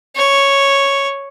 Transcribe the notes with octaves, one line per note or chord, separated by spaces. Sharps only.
C#5